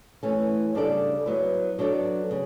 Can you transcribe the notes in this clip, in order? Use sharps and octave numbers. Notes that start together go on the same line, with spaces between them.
E3 A3 C#4
C#3 G3 D4 A4 D5
F#3 B3 E4
F#3 B3 D4 A4 D5
C#3